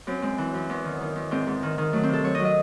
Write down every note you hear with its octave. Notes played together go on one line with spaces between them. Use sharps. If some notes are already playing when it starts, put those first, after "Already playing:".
F#2 C4
G#3 C4
E3
F#2
E2
D#3
D#3
E2
G#2 C4
G#2
D#3
D#3
F#3 A3
C4
C3 A4
F#3 C#5
D#5
F#3
D#5